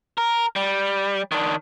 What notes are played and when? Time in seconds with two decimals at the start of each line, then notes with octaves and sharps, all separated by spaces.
0.18 A#4
0.56 G3
1.32 D#3 D4